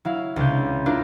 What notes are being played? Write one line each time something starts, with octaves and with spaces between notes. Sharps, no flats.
F#3 E4 F5
C#2 C3 C#4 D4 G6
D4 E4 F4 A#4